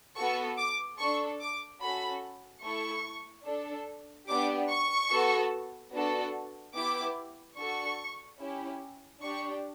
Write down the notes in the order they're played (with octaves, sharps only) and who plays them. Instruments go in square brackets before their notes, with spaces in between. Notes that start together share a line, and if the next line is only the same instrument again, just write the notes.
[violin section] B3 F#4 A4 C#6
D6
D4 A4 C#6
D6
C#4 F#4 A4 B5
A3 E4 A4 C#6
D4 A4
B3 D4 G4 D6
C#6
B3 F#4 A4
B3 D4 F#4 A4
B3 E4 G4 D6
D4 F#4 A4 C#6
C#4 E4 G4
D4 G4 C#6